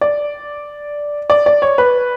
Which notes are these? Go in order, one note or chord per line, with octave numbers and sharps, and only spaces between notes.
D5
D5
D5
C#5
B4